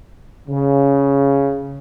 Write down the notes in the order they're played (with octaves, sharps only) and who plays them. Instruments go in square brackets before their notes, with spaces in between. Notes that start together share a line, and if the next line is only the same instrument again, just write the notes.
[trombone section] C#3